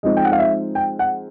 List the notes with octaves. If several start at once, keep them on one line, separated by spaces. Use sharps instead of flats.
F3 G#3 C4 D#4 D#5
G5
F#5
F5
E5
G5
F#5